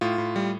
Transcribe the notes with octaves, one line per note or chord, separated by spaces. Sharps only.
A2 F4
A2
G3